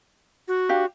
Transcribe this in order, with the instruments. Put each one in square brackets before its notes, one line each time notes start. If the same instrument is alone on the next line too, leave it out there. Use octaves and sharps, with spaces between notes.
[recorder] F#4
[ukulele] D4 G4 F5